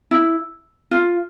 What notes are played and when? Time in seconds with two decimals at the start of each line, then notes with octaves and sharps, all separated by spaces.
0.11 E4
0.91 F4